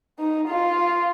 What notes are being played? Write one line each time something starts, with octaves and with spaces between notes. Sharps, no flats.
D#4
F4